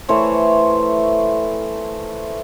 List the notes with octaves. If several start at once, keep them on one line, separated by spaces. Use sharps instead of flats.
E3 A3 C5 C#5